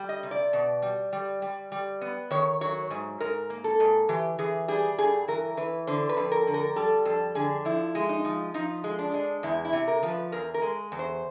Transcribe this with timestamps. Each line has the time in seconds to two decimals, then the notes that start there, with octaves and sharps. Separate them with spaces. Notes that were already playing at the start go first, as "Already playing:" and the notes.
Already playing: G3
0.09 D#5
0.23 C3
0.31 D5
0.53 B2
0.82 G3
1.13 G3
1.42 G3
1.72 G3
2.01 B3
2.31 D#3 C#5
2.61 F#3 C#5
2.90 G#2
3.20 G#2 A#4
3.50 A#3
3.64 A4
3.80 G#2
4.09 E3 G4
4.39 E3 G#4
4.68 G3 G#4
4.98 G2 G#4
5.28 E3 A#4
5.57 E3 B4
5.87 D3 C5
6.09 B4
6.17 F2
6.32 A#4
6.47 D3
6.54 A#4
6.76 G3 A4
7.05 F2 A4
7.35 D3 G#4
7.65 F3 E4
7.95 G#3
8.09 D#4
8.25 F3
8.54 F3 D#4
8.84 G#3
8.99 D4
9.14 G#3
9.43 E2 E4
9.65 E4
9.73 C3
9.88 A#4
10.03 F3
10.10 B4
10.32 E2 A#4
10.54 A#4
10.62 G#3
10.92 E2
10.99 C5